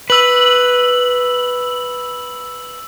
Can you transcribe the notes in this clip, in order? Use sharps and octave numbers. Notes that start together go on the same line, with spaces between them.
B4 E6 F#7